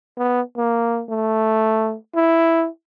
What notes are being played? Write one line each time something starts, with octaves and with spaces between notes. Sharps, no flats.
B3
A#3
A3
E4